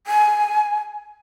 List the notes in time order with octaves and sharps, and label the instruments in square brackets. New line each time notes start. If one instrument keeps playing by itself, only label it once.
[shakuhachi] G#5